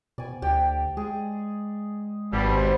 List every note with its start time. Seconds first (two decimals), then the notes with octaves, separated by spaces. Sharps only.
0.18 B2 D5 G#5
0.42 D2 G4 D5 G5
0.97 G#3 G#4
2.33 G#1 B2 G3
2.49 G#2 C5